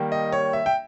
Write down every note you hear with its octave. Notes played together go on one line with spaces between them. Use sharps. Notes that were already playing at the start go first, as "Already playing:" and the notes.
Already playing: D#3 G3 A#3
D#5
C#5
E5
G5